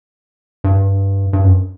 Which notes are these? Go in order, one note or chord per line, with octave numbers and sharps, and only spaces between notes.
G2
G2
F#2